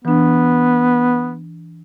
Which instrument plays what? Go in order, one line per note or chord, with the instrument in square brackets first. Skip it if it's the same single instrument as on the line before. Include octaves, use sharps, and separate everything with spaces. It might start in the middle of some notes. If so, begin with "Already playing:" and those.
[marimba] E3 D4 [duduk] B3